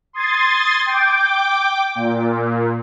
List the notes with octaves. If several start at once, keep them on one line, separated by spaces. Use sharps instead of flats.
C6 D#6 G#6 A6
G5 D6
A#2